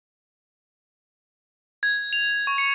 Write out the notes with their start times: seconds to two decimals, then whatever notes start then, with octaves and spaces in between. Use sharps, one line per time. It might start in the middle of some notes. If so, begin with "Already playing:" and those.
1.83 G#6
2.13 F7
2.47 C#6
2.58 C#7